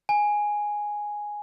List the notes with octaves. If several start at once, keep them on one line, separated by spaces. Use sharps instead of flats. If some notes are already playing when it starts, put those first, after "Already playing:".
G#5